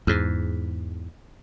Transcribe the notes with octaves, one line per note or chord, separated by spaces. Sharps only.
E2 G#2